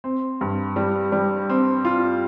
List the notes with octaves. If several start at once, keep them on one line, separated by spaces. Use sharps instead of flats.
C4
G2
G3
G3
C4
F4